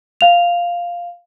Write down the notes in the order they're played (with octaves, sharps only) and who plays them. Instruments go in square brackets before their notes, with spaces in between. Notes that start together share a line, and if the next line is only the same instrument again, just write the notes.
[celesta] F5 F7